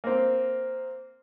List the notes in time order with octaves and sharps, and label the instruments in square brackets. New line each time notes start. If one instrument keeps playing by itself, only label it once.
[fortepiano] A#3 C4